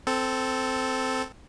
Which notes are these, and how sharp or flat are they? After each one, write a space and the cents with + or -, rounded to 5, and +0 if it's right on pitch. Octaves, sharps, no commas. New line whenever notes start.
C4 -10 A4 +0